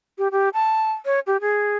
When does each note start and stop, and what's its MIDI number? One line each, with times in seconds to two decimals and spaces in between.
0.18 0.28 67
0.32 0.49 67
0.54 0.91 81
1.05 1.19 73
1.27 1.37 67
1.41 1.78 68